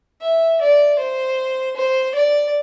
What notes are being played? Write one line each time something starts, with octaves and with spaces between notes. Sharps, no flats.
E5
D5
C5
C5
D5